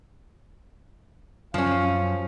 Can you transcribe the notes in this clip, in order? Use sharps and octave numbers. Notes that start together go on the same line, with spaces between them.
F#2 F3 C#4 F5